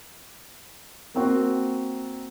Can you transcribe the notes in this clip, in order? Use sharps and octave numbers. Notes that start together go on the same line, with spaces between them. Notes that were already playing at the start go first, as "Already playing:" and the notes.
A#3 C4 F#4